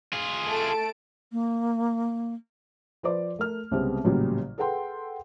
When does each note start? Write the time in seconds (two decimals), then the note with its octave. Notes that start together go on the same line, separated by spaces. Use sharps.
0.13 F4 G#4
0.46 A3 A5 D7
1.32 A#3
3.03 F3 B4 C5 D5 D6
3.39 A3 A#4 F6
3.71 C2 C#3 G3 G#3 B3 C4
4.04 A1 A#2 C#3 F#3 G3
4.58 G#4 A4 B4 F#5 G5 C6